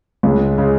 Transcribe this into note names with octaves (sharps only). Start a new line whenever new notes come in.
C#2 C#3 G#3
C#3 G#3